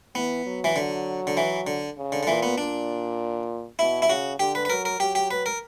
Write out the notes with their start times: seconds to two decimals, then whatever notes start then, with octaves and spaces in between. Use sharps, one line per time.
0.15 E3 B3
0.46 F#3
0.64 E3
0.76 D3 F#3
1.27 D3
1.37 E3
1.67 D3
1.98 C#3
2.12 D3
2.23 D3
2.27 A#2 E3
2.43 B3
2.58 A#2 D4
3.79 B2 E4
4.02 E4
4.09 C#3 F#4
4.39 D3 G4
4.55 B4
4.65 B4
4.70 F#3 A#4
4.85 A#4
5.00 F#3 G4
5.15 G4
5.31 B4
5.46 A#4